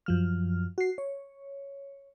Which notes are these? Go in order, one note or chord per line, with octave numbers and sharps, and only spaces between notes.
F#2 F3 F6
F#4 C7
C#5